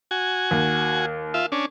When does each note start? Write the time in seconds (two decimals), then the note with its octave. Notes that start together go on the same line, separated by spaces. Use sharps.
0.11 F#4 G#5
0.51 D#2
1.34 F4 E5
1.52 C#4 D4